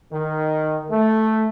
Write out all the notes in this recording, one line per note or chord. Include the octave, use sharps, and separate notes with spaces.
D#3
A3